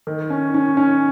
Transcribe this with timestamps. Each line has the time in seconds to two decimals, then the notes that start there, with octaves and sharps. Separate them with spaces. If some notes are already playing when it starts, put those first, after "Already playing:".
0.07 D#3
0.30 C#4
0.54 C#4
0.77 C#4